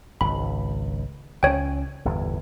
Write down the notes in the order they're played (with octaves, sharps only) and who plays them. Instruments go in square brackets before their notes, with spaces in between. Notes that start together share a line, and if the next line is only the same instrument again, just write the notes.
[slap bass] G#1 C#2 [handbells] B5
[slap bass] C#2 C#4 [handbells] C#5 G5
[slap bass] G1 E2 A2